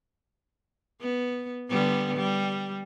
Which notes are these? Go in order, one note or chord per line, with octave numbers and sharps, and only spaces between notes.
B3
D3 G3 B3
G3